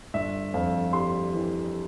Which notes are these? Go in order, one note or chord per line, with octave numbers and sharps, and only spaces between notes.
G1 E5
F2 F5
G3 C6
E3